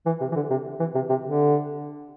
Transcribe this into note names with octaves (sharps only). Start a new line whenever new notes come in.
E3
C3
E3
D3
C3
E3
C3
C3
D3